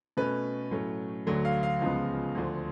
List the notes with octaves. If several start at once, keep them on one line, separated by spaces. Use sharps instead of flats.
B2 A3 C#4 B4
A2 F#3 A3 C#4
D2 D3 F#3 A3
F5
F5
C#2 C#3 F3 G#3 B3
D2 D3 F3